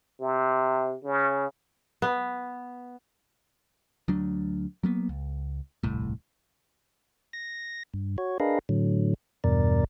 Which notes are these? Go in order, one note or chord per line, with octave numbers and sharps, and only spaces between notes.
C3
C#3
B3
D2 F#3 D4
F#3 A#3 B3
C#2
D#1 C2 A2
A#6
G2
F#4 C#5
D4 G#4 A#4 B4 D#5 F5
A2 D3 F#3
E2 G2 B2 A#4 D5